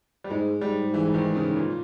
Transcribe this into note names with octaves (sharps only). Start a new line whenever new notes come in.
G3
G#2 G#3
G#2 G3
E3
D#3
C#3
A#2